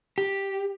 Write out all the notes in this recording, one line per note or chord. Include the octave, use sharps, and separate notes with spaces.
G4